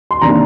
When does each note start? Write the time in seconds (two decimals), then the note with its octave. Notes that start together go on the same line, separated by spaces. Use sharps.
0.11 C6
0.22 C3 D#3 A#3 D4 A#5